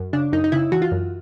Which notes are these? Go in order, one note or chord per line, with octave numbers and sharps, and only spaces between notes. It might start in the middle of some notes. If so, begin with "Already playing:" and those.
Already playing: F#2
C#3 D4
F#2 D#4
D#4
C#3 E4
E3 F#4
F4
F#2